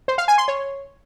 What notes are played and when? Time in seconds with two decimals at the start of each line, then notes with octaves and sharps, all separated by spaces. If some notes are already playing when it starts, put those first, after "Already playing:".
0.08 C5
0.18 F5
0.28 G#5
0.38 C6
0.48 C#5